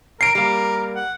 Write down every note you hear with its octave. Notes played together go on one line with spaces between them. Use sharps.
A#4 C7 D7
G3 A#3 A#4
F#5